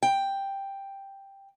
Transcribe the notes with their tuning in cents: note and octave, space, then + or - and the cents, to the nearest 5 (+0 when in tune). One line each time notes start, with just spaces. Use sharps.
G5 +5